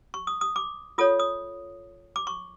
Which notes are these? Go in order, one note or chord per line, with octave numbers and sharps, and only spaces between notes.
C#6
D#6
D#6
D6
F4 A4 C#5 D#6
D#6
D6
C#6